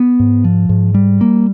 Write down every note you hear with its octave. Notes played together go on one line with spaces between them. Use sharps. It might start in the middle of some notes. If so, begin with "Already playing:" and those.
Already playing: B3
G#2
F3
G#2
G3
A#3